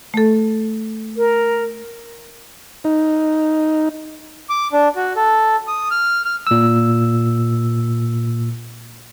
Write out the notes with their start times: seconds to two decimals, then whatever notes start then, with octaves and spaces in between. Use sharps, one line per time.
0.14 A3 A4
1.17 A#4
2.84 D#4
4.49 D6
4.72 D4
4.96 F#4
5.16 A4
5.68 D#6
5.91 F6
6.25 F6
6.47 A#2 E6